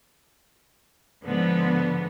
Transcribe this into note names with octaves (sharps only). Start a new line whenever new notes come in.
G#2 D3 F3 B3